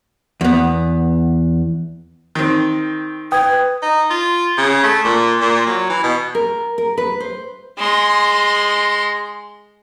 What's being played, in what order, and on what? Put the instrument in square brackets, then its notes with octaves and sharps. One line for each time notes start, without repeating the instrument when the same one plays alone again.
[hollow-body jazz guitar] E2 B3
[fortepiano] D#3 C4
[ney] B4 [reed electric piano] G5 [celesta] D#6 G#6
[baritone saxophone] D#4
F4
C#3
A3
A#2
A#2
F#3
E3
B2
[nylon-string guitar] A#4
A#4
B4
C5
[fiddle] G#3 C6